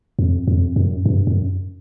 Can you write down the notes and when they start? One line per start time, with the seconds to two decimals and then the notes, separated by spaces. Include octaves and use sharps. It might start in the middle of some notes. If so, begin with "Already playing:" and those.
0.19 F2
0.48 F2
0.76 F#2
1.06 G2
1.27 F#2